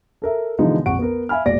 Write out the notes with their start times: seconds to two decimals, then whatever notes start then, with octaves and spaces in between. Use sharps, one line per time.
0.22 A4 A#4 E5
0.59 B2 D3 E3 F3 G#3 D#4
0.86 A#1 F2 F#5 C#6 D7
0.99 B3 A#4
1.29 E5 F5 G#5 B5 F6
1.45 E1 A#2 D5 A#6 D7